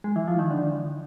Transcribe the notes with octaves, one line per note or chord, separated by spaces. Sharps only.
G#3
E3
F3
D#3
D3